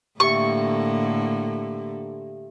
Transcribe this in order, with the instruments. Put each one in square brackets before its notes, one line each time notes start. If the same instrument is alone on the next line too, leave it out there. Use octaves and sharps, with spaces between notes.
[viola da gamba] A2 D3 A#3 [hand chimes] G4 E5 [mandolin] C#6